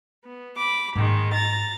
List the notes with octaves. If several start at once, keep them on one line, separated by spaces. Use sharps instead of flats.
B3
B5 D6
G#2 D#3 G#3 A#3
A#5 A6